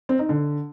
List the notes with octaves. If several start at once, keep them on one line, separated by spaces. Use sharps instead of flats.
C4
D#4
D3